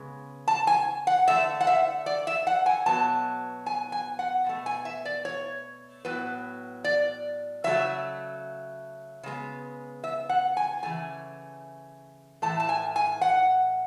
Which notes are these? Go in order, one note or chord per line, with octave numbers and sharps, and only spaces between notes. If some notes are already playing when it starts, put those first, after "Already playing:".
Already playing: C#3 G#3 B3
A5
G#5
F#5
D3 A3 E5
F#5
E5
D5
E5
F#5
G#5
B2 F#3 B3 A5
G#5
G#5
F#5
B2 A3
G#5
E5
D5
C#5
A2 F#3 B3 B4
D5
C#3 F#3 A3 E5
C#3 G#3 B3
E5
F#5
G#5
C#3 E3 A3 G#5
A2 E3 A3 A5
A5
G#5
G#5
F#5